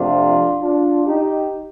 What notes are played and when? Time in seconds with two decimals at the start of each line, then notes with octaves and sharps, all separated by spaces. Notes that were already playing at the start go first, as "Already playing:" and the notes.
Already playing: F2 C3 F3 A3 D4 F4
0.62 D4 F4
1.07 D#4 G4